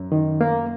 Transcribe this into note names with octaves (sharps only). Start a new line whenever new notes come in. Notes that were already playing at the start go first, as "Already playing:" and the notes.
Already playing: F#2
D#3
A#3